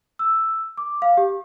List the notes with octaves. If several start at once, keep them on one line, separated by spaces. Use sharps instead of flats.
E6
D6
F5
G4